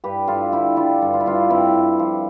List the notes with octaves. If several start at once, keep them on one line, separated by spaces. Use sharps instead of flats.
G2 G4 B4
G2 F4 A4
D3 E4 G4
G3 D4 F4
G2
F4
E4
G2 D4 F4
G2 C4 E4
G2
F3